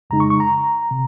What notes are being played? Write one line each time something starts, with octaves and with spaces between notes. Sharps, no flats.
F2 C#3 G#3 D#4 A#5
C#6
C#6
A#5
C3